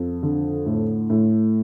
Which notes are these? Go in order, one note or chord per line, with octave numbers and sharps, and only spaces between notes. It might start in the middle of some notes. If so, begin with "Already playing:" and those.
Already playing: F2
D3
A2
A2